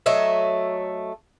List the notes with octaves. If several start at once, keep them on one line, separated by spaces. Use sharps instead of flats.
F#3 A3 D#5 E5